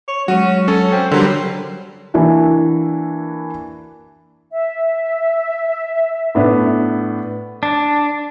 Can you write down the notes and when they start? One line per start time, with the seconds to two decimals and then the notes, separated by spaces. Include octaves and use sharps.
0.08 C#5
0.28 F#3 G#3 C#4 F#4
0.68 C#4 A4
0.92 C4
1.11 D3 F#3 G3 A#4 C5
2.14 E3 A#3 D4 E4 F#4
4.52 E5
6.35 A2 B3 D4
7.63 D4